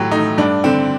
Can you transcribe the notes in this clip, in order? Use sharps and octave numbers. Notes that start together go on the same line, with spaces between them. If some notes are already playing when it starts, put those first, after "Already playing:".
Already playing: A2 F#3 G4
A3 D#4
G2 D4
D3 C4